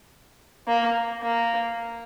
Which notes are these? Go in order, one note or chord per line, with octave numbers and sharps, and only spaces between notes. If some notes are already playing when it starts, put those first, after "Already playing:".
A#3
A#3